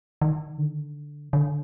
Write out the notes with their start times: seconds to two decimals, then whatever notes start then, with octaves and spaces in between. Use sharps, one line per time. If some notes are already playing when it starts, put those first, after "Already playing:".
0.22 D#3
0.58 D3
1.33 D3